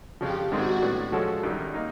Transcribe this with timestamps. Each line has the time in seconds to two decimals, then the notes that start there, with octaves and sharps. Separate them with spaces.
0.21 F2 C#3 F3 G4
0.51 G#2 D#3 G#3 C4 F#4
0.82 A2 F#3 B3 D4
1.12 F3 G#3 C#4 F#4 A4
1.43 F#2 D#3 G3
1.74 A#3 D#4